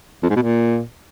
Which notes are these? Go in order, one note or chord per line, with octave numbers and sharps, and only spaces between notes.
F2
G#2
B2
A#2